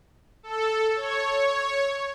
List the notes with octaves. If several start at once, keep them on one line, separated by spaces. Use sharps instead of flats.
A4
C#5